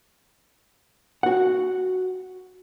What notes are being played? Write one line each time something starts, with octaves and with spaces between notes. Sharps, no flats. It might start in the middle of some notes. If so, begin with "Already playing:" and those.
F#4 F#5